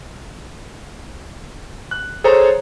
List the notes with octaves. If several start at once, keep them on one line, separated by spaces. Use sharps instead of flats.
F#6
G#4 A4 C5 C#5 A#5